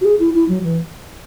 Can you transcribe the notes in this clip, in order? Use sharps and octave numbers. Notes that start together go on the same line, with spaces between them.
F#4
G#4
E4
E4
F#3
E3